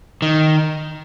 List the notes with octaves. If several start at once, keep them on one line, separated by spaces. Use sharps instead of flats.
D#3